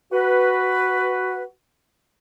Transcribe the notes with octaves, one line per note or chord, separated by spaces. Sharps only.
F#4 B4